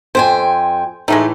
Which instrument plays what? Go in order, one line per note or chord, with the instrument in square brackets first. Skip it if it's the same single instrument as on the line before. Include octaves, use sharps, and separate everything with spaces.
[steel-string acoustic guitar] F2 G5 G#5 [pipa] C5
[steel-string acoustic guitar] A2 E3 [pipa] G#3 A3 D#4